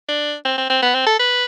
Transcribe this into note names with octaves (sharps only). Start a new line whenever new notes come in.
D4
C4
C4
C4
B3
C4
A4
B4